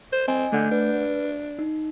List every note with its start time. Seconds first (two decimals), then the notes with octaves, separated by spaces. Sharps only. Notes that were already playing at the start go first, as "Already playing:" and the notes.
0.13 C5
0.28 C4 D#5 G#5
0.52 D3 A3 F#5 G6
0.71 D4 B4
1.59 D#4